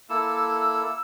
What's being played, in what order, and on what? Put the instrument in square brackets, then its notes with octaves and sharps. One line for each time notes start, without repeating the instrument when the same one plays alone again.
[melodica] A#3 E4 A4 [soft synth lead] E6